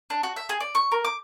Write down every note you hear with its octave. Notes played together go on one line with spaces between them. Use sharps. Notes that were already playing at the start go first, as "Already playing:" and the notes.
D4
F#4
E5
G#4
D5
C#6
A#4
D6